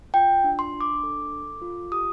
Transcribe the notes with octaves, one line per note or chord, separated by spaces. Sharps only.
F4 G5
D4
C6
D4
D6
A4
A4
F4
G4 D#6